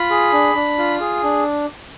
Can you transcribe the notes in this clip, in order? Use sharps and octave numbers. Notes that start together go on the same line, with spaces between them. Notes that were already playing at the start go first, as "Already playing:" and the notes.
Already playing: F4 B5
G#4
D4
D4
F4
G#4
D4